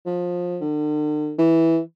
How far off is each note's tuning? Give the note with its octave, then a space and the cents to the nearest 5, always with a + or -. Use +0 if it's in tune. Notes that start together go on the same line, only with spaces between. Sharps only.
F3 +20
D3 +45
E3 -10